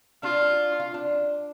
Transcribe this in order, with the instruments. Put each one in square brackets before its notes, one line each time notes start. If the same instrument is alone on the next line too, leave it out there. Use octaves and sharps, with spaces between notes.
[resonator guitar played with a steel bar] D4 [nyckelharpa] F4
[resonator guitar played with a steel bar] F4
D4